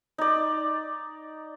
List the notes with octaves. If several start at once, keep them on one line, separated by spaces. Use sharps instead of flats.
D#4 D5